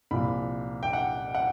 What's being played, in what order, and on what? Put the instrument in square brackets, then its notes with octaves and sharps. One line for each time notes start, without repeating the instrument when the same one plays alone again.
[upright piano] C2 A#2 F3 B5
G5
F#5
F#5